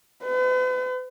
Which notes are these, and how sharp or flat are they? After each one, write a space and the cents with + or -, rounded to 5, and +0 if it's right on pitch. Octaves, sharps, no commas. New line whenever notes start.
B4 +45